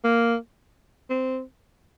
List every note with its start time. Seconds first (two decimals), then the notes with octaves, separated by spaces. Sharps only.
0.04 A#3
1.10 C4